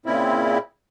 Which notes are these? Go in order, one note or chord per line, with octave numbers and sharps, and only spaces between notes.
A#2 C#3 C4 E4